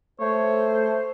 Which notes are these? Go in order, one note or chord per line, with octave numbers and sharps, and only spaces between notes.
A3 C5 C#5